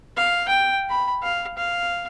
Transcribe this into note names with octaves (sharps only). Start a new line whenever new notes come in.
F5
G5
B5
F5
F5